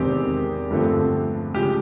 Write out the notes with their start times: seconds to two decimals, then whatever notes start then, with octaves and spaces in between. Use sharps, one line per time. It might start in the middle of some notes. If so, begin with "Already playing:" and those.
Already playing: E2 C3 D#3 G#3 C4 G4
0.71 G2 D3 F3 A3 C4
1.54 C#3 F3 G#3 G4